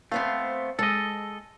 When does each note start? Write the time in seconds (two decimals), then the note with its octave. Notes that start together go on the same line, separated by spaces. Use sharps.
0.12 A3 B3 C4 C5 F5
0.79 G#3 A4 D#5